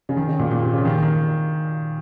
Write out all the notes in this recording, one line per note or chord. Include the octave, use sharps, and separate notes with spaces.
C#3
D#3
C#3
A#2
A#2
C3
C#3
D#3
D#3